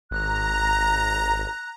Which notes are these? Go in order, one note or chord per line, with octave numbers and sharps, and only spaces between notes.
G#1 A#5 F#6